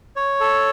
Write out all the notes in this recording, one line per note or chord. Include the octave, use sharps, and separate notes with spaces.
C#5
A4